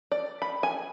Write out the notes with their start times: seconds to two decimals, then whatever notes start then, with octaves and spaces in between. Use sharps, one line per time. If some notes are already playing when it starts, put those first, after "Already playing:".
0.12 D5
0.42 B5
0.63 G#5